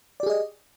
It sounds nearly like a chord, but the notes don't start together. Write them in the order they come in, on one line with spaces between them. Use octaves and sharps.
D5 G4 G#4 D#5